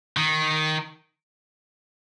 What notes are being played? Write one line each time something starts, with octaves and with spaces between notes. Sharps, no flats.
D#3